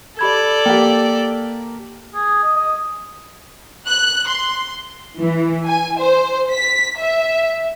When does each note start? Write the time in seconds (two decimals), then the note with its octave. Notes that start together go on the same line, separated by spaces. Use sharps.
0.19 G4 A4 D5 B5 G#6
0.66 A#3 G4 G5
2.15 G#4
2.44 D#5
2.56 D#5
3.86 F#6
4.26 C6
5.18 E3
5.66 G#5
5.99 C5
6.51 B6
6.99 E5